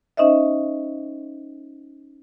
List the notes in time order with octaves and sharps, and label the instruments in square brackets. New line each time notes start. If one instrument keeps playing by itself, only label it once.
[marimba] C#4 D#4 C5 D#5 E5